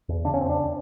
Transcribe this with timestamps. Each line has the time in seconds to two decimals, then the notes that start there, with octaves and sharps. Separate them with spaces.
0.09 E2
0.25 C#3 D4
0.34 C#4
0.41 E2 C4
0.49 D4